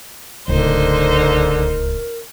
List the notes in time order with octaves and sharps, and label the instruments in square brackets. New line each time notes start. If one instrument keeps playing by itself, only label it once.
[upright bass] D1 C#2 [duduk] D3 [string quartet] D#4 C5 [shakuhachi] A#4